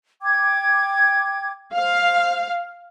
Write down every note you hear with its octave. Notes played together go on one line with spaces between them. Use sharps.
G5 D6 G#6
C5 F5